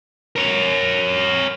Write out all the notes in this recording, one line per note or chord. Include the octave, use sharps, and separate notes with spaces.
A#4 C#5